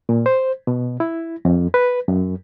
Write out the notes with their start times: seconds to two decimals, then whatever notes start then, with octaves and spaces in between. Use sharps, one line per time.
0.09 A#2
0.26 C5
0.67 B2
1.00 E4
1.45 F2
1.74 B4
2.08 F#2